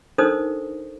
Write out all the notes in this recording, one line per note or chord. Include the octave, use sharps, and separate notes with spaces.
D4 D#4 A4 A#4 C5 D#6